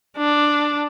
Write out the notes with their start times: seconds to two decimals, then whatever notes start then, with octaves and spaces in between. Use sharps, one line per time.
0.17 D4